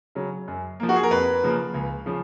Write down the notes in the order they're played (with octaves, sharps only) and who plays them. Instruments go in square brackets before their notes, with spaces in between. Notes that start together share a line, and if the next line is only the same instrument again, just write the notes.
[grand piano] C#3 F#3
F#2
F3 A#3
F#4
G#4
A#4
F2 B4
C#3 F3 A#3
C#2
C#3 F3